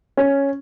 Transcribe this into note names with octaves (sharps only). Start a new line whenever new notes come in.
C#4